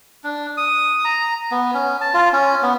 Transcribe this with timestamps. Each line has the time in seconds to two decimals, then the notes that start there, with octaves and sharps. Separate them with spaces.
0.24 D4
0.57 D#6
1.04 A#5
1.51 B3
1.74 C#4
2.01 A5
2.14 F4
2.32 C#4
2.63 B3